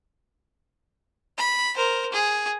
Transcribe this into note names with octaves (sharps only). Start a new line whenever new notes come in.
B5
A#4 C5
G#4